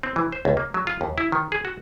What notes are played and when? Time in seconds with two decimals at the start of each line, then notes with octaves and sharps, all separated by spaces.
0.03 C4
0.16 E3
0.32 C5
0.45 C#2
0.57 A#3
0.74 F#3
0.87 F4
1.01 D#2
1.18 E4
1.32 D#3
1.52 G#4
1.65 F#4